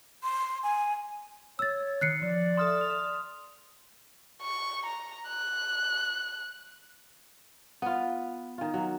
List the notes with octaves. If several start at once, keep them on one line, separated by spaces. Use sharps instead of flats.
C6
G#5
C#5 E6 A6
D#3 F#6 C7 C#7
F3 D5
A4 E5 C6 D#6 F6 E7
F6 F7
C#6
A#5
F#6
B3 F4
D#3 F4
F#3